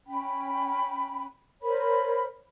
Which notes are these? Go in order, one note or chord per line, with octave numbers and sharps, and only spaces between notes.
C#4 G5 B5
A#4 C5 C#5 B5